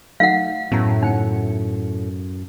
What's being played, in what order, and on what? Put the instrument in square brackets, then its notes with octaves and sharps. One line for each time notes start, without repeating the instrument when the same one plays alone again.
[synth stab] F#3 A3 D#4 [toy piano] F5 F#5
[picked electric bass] F#2 [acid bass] A2 [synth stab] B3 A#5
[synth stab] C#3 F#5 C#7 [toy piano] D#4